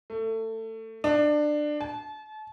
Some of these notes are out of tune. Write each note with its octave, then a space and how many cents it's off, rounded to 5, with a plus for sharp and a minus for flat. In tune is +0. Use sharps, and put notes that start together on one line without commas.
A3 +25
D4 +20
A5 -35